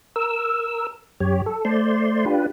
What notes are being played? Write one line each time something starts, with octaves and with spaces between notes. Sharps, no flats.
A#4 E6
F#2 G4 C#5
A4
A3 C5 D5 C6
D4 F4 G4 B4